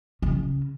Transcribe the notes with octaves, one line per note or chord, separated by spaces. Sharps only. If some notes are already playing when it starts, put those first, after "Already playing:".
C#3